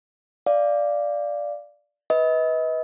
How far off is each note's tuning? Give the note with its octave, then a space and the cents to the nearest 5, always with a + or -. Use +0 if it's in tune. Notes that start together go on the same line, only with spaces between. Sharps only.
D5 +0 F5 -10
B4 +0 D#5 +35